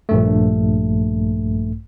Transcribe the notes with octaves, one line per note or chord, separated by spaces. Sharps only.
A#1 G2 A3